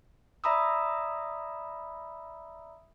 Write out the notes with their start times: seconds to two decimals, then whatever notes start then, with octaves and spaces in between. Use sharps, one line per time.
0.44 D5 E5 A#5 B5 D#6 E6